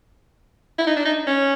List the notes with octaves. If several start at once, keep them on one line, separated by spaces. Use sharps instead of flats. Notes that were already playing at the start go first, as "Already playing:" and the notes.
E4
D#4
D4
D#4
C#4